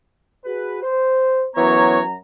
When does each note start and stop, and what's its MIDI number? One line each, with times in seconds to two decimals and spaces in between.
0.44 0.79 66
0.44 0.79 68
0.44 0.79 71
0.82 1.47 72
1.56 2.16 42
1.56 2.00 52
1.56 2.00 59
1.56 2.00 73
1.56 2.16 82